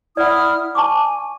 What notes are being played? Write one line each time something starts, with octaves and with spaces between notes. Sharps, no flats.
E4 D5 F#5 D#6 F6
G#5 A5 C#6 D6